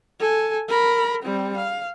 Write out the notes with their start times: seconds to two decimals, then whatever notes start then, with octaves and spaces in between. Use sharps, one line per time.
0.20 A4 G#5
0.69 A#4 B5
1.23 G3 C4
1.57 F5